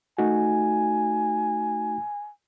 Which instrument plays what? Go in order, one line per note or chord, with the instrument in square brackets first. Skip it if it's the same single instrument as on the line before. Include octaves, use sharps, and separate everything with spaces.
[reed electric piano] A3 D#4 F#4 [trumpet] G#5